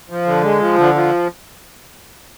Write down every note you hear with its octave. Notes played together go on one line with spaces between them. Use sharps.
F3
D3
G#3
F3
D3
F3